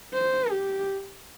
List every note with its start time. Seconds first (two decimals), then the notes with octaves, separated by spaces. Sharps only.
0.14 C5
0.51 G4